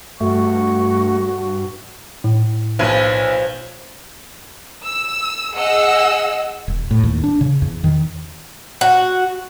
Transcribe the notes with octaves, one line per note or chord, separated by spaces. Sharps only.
G2 A3 F#4 C#6
A2
B1 F3 B4 G#6 D#7
E6
G#4 D#5 F#5 E6
E1
A2
D#2
D4
C#3
E2
D#3
F#4